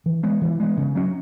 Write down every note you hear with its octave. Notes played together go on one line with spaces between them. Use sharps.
E3
G#3 B3
E3
G#3 B3
C#3
F#3 C#4